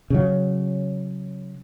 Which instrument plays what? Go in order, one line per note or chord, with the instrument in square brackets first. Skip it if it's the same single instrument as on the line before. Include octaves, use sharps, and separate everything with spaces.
[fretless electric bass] C#3 F#3